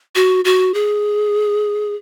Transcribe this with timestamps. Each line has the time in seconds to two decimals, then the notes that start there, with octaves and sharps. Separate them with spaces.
0.15 F#4
0.45 F#4
0.74 G#4